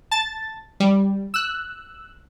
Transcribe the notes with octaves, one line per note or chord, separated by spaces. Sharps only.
A5 A6
G3
E6 F#6